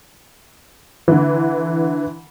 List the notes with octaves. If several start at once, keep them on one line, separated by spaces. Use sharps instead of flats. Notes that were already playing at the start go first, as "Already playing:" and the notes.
D3 E3